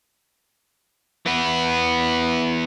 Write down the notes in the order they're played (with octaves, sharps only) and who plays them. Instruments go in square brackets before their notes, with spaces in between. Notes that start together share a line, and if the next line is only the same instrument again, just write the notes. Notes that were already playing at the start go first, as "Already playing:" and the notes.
[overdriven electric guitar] E3 B3